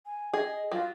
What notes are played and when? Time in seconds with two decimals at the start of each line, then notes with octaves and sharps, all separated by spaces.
0.06 G#5
0.34 G#4 D#5
0.72 F#3 F4